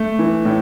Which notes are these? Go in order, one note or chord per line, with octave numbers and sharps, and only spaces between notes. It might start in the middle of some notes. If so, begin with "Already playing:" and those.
Already playing: A3
E3
A2